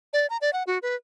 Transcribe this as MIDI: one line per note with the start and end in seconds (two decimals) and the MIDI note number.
0.13 0.27 74
0.30 0.37 82
0.41 0.50 74
0.53 0.63 78
0.67 0.78 66
0.82 0.95 71